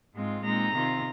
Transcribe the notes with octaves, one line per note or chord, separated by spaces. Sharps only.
G#2 G#3 C4 F4
A#2 G#3 C4 D#4 A#5
C3 D#3 C4 F4